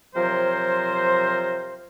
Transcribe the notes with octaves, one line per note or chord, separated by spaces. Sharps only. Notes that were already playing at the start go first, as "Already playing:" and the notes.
C3 F3 F#3 A#4 C5